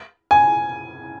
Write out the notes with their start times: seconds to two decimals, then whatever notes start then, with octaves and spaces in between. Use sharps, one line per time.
0.31 G#5